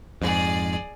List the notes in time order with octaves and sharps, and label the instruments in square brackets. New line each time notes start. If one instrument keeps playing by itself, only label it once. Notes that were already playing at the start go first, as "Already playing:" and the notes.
[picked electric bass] F2 G#2 [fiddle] G#4 D5